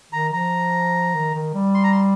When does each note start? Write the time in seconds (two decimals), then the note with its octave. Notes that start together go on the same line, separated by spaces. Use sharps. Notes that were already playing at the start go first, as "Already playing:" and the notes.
0.12 D#3 A#5
0.33 F3 A#5
1.14 D#3
1.34 D#3
1.54 G3
1.74 C6
1.84 A#5
1.92 C6